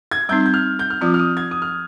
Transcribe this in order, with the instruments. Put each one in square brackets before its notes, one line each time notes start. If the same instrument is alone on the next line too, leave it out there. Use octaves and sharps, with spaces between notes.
[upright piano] G#6
[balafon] G3 C4 D#4 [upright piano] G6
[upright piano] G6
F6
G6
F6
[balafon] F3 C4 F4 [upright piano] D#6
[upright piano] F6
D#6
G#6
D#6
F6